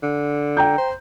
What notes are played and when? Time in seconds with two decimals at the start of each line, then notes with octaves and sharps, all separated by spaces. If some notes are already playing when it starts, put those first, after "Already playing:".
0.03 D3
0.57 G5 A#5 G6
0.78 C5